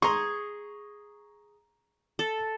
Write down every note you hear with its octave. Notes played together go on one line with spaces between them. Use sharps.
G#4 A#5 C6 C#6
A4